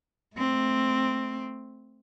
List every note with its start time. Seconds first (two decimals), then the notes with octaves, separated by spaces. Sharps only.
0.37 A3 C4